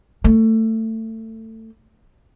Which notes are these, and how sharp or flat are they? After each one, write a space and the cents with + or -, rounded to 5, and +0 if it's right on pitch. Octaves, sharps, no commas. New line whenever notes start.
A3 +20